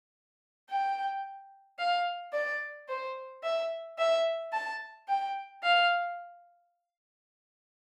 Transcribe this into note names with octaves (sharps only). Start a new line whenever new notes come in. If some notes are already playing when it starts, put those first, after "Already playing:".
G5
F5
D5
C5
E5
E5
A5
G5
F5